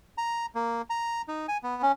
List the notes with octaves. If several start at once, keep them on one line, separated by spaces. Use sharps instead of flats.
A#5
A#3
A#5
D#4
G#5
B3
C#4